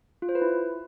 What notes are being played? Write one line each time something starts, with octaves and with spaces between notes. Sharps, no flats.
F4
C5
B4
E4